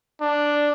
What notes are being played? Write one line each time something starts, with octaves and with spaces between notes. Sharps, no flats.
D4